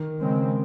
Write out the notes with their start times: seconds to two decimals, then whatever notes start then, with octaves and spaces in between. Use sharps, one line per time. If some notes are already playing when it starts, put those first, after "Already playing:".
Already playing: D#3
0.20 C#3 G#3 C4